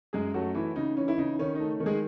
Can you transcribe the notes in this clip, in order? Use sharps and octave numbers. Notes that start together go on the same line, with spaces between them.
F#2 G#3 G#4
F#3 A3 F#4
E3 E4
C#3 D#4
E3 C#4
E4
C#3 D#4
D#3 C#4
A3 D#4
D#3
G#3 G#4